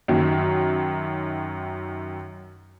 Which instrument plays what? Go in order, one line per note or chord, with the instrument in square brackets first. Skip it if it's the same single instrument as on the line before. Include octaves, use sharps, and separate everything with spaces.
[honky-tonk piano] F#2 D#3 F#3